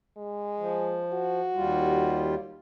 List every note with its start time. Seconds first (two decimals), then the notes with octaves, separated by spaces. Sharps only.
0.17 G#3
0.59 F3
1.13 F#4
1.55 D#2 G3 F4